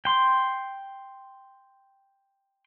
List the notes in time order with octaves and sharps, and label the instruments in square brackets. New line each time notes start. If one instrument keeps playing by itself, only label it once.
[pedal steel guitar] G5 C6